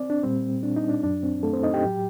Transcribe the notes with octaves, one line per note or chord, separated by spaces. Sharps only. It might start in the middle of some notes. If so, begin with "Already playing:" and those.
Already playing: C4 D5
D4
A#2 G3 C4
D4
D#4
D4
F#2 F#3 D4
C4
A3 A4
C4 C5
D#4 D#5
G4 G5
A2 F#3